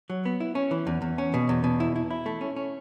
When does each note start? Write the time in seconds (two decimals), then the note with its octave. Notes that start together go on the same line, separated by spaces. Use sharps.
0.10 F#3
0.25 B3
0.40 E4
0.55 C#4
0.71 E3
0.87 E2
1.02 E2
1.18 C#4
1.34 B2
1.49 E2
1.64 B2
1.80 E4
1.96 E4
2.11 E4
2.26 A3
2.41 C#4
2.56 C#4